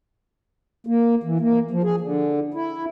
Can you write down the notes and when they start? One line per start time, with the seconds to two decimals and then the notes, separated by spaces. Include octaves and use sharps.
0.87 A#3
1.23 E3
1.40 A#3
1.71 F3
1.83 G#4
2.00 D3
2.54 E4